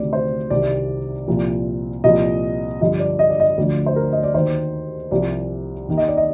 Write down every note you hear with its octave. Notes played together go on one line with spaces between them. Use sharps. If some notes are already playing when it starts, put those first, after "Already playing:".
Already playing: D2 C3 D#3 D5
C5
C2 C3 D#3 D5
C2 A#2 F3
C2 A#2 F3 D#5
G2 D3 F3 D#5
D5
D#5
D5
D#5
D2 D3 F3 D5
C5
A#4
D#5
D5
D#2 D#3 C5
C2 C3 F3 D5
D#2 D#3
D#5
D5
D#5